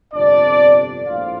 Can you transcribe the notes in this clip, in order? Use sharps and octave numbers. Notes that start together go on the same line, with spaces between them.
G1 F2 C3 D4 D5
A#1 A2 F3 F4 F5